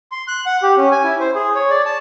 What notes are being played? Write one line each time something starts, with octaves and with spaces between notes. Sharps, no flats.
C6
F#6
F#5
G4
C#4
G#5
E4
C5
G#4
C#5
D5
A5